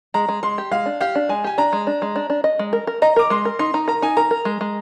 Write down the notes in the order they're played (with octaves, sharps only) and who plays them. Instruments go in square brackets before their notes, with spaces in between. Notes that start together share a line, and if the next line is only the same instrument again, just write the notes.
[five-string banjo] G#3 [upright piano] A#5
[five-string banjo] G#3
[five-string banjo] G#3 [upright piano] C6
[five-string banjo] G4
[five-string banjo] G#3 [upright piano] F5
[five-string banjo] D4
[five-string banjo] G4 [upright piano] F5
[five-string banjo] D4
[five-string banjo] G#3 [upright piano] G#5
[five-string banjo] G4 [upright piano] G#5
[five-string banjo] D4 [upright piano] A#5
[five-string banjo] G#3
D4
G#3
D4
D4
D#5
G#3
A#4
A#4
[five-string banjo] D#5 [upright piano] A#5
[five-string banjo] A#4 [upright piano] D6
[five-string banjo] G#3 [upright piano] C6
[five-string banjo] A#4
[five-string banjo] D#4 [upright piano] C6
[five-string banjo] D#4 [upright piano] A#5
[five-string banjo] A#4 [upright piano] A#5
[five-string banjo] D#4 [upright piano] G#5
[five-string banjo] A#4 [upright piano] A#5
[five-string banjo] A#4
G#3
G#3